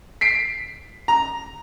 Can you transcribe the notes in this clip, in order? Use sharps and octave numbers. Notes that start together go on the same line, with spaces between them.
B6 C7 D7
A#5